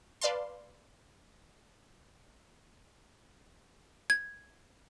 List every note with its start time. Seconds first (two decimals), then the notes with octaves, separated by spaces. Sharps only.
0.21 B4 D5 F5 A5 C6
4.10 G#6